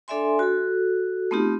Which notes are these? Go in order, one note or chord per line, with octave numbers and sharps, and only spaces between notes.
D4 A4 D5 E5 G#5 C6
F#4 A4
A3 B3 C4 D#4 F4 G4